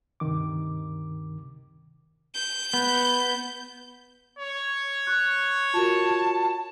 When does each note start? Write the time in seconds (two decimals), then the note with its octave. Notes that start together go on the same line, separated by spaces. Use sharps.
0.20 D2 G2 C3 D#3 D6
2.35 G6
2.74 B3
4.39 C#5
5.07 C#6 F#6
5.74 F4 F#4 A#4 A5